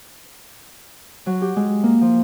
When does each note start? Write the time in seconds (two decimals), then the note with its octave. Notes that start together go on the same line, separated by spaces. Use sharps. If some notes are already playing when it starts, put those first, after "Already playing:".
1.26 F#3
1.41 G4
1.56 G#3
1.83 A#3
2.01 F3